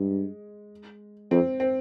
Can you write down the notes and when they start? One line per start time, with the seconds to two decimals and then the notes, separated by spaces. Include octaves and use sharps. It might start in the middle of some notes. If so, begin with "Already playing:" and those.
Already playing: G2 G#3
1.31 F2 C4
1.60 C4